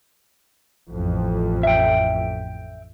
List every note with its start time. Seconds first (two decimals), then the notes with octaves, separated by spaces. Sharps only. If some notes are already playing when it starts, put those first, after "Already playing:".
0.92 A1 F2
1.63 E5 G5